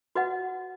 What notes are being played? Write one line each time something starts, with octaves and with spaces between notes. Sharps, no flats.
F#4 B4 D#5 F#5